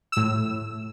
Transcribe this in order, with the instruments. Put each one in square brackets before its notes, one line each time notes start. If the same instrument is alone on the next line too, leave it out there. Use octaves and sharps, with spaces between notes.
[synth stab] A2 E6